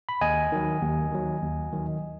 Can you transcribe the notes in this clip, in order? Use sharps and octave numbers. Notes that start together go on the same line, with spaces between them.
B5
D#2 D#5 G#5
D#3 F#3
D#2
D#3 F#3
D#2
D#3 F#3